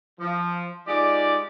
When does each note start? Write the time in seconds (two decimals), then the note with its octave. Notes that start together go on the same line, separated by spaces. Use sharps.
0.20 F3
0.88 G#3 D#4 F4 G4 D5